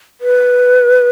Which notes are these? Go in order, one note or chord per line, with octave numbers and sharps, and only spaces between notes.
B4